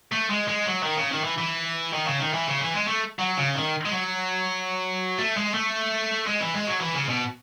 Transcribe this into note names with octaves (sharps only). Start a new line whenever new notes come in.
A3
G#3
G#3
F#3
D#3
C#3
D#3
E3
E3
D#3
C#3
D#3
E3
C#3
E3
G#3
A3
F#3
C#3
D#3
G#3
F#3
A3
G#3
A3
G#3
E3
G#3
F#3
E3
C#3
B2